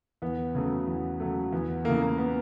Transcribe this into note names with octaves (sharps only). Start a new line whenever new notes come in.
E2 B3
C#3 F#3 A3
E2
C#3 F#3 A3
E2 B3
C#3 E3 A3 A#3
A#3
B3